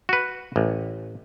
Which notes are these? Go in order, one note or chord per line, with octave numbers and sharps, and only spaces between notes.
F#4 B4
A1